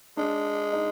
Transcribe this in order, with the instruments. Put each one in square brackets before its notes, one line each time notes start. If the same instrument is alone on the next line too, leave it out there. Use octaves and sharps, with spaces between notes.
[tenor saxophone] G#3 [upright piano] D4
[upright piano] D#4